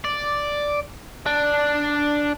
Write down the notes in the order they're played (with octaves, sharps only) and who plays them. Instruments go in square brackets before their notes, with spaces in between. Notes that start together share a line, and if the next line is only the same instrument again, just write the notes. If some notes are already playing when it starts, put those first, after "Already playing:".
[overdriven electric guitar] D5
D4